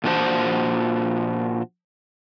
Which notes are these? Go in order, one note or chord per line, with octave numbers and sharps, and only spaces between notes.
A#2 F3 D4 F#4 C5 A5